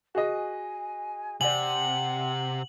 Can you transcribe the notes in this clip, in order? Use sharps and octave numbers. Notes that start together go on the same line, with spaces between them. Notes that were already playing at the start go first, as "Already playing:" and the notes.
F#4 G#4 D#5 G#5
C3 D5 F#5 G#5 F#7